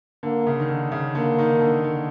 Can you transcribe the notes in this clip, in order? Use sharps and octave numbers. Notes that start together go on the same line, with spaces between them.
D3 A#3
C#3
D#3
D3
C#3
D3 A#3
D#3
D3
D3